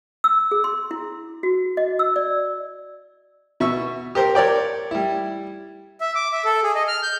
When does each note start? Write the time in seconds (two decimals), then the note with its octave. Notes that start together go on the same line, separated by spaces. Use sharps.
0.24 E6
0.51 G#4
0.64 C6
0.91 E4
1.43 F#4
1.77 D#5
1.99 E6
2.16 D5
3.60 B2 E5 C#6
4.15 G4 A#4 C5
4.35 A#4 C#5 D5 G5
4.91 G3 E4
6.01 E5
6.15 D6
6.32 E5
6.45 A4
6.63 G#4
6.75 D#5
6.88 F6
7.03 G6